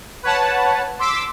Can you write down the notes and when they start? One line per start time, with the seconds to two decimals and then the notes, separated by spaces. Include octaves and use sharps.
0.23 B4 C#5 F#5 A5
0.99 C6 D6 E6 B6